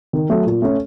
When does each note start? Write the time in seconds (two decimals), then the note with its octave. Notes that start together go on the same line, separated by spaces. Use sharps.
0.13 D#3
0.29 F#3 A3
0.46 A#2
0.62 A3 C#4